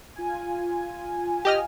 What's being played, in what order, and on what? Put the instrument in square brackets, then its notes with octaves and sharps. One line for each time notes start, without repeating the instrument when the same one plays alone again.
[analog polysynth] F4 G#5
[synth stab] G4 D#5 F6